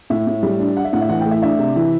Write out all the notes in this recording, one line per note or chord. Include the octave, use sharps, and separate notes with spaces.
A2 E5
A2
G3
D4
D4 F#5
E5
A2 F#5
E5
E3 F#5
G5
A3
E5
D4 E5
C3
E3